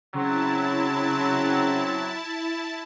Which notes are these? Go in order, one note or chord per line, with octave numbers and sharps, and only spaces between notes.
C#3 F#3 C4 E4 A5